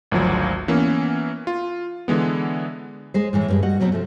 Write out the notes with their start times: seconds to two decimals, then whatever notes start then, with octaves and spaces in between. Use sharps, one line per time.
0.12 G#1 D2 F3 F#3
0.68 E3 A#3 B3 C#4
1.47 F4
2.08 D3 E3 G#3 B3
3.14 G#3 C5
3.33 A2 E3 G#3
3.48 G2 D3 F3 G3 G#3
3.63 G3 F#4 D#5 F#5
3.80 F#2 B2 F#3 G3 B3 C4
3.92 C3 F3 A3